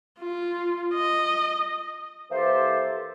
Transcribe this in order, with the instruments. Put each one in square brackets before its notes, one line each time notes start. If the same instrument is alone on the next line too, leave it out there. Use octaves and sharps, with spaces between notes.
[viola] F4
D#5
[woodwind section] E3 A#3 G4 A4 C5